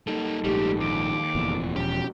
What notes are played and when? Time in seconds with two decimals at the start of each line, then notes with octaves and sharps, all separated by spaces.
0.07 G3 A#3 D#4 A4
0.44 A#1 G#2 G3 A3 G4
0.80 D#2 D6
1.35 F1 E2 A#2
1.76 E1 B2 F3 C#4 G4